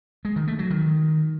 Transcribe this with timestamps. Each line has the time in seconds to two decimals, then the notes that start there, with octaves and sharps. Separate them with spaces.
0.25 G#3
0.36 D#3
0.48 A3
0.59 F#3
0.70 D#3